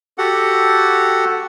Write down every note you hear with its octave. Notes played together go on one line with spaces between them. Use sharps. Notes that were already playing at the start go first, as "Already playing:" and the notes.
F#4 G4 A4 F#5